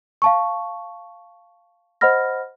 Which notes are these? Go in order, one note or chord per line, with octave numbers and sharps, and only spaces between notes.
F5 A5 C#6
C5 D#5 F#5 B5 F6 A#6